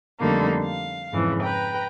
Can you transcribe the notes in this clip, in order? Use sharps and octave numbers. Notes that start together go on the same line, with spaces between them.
F2 D3 G3 A3 A#3 D#4
F5
F2 G#2 C#3 E3
B4 G5 A#5